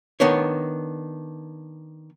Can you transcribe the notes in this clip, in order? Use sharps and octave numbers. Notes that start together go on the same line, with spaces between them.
D#3 B3 D4 C#5